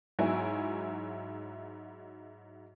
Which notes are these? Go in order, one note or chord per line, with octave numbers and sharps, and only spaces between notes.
G#2 F#3 E4 C#5 E5 G#5